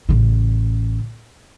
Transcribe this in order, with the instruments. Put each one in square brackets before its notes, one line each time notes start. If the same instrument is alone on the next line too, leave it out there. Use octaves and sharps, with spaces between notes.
[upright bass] A1 C#3